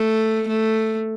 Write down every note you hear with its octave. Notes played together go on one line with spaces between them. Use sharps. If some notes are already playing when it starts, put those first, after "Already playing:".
Already playing: A3
A3